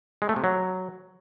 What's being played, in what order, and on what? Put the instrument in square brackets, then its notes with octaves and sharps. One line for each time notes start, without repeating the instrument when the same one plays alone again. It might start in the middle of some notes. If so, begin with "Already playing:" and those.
[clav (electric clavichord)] G#3
A3
C3
F#3